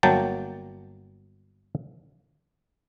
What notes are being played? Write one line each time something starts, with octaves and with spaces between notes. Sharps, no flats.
G1 F#3 A#3 G5 A5